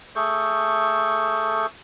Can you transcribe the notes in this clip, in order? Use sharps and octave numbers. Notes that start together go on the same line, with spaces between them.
A3 G#4 A4 C#6 G6